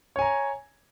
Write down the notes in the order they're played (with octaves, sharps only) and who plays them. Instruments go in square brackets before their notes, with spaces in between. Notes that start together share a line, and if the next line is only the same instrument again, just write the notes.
[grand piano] C#5
G#5
A#5